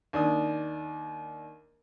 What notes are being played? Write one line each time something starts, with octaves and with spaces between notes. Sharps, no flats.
D#2 D4 D#6